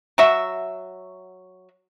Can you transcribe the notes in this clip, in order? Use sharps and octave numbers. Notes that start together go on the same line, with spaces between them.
F#3 F#4 E5